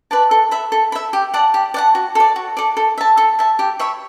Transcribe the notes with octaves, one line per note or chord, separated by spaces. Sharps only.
B4 D5 A5
A4
E5 B5
A4
E5 B5
G4
D5 F#5 A5
G4
D5 F#5 A5
F#4
A4 D5
F#4
A4 D5
A4
E5 A5
A4
E5 A5
G4
C#5 E5 B5